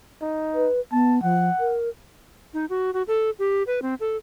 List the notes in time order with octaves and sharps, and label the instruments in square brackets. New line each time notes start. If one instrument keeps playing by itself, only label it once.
[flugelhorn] D#4
[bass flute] B4
[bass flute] B3 [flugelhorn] A5
[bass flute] F3 [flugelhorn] F#5
[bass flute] A#4
[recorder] D#4
F#4
F#4
A4
G4
B4
C4
A4